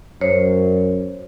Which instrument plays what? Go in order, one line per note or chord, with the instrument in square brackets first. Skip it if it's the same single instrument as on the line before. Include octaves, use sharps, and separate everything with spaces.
[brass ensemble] F#2 [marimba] C5 C#5